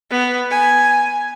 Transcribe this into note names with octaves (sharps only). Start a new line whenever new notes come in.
B3
G#5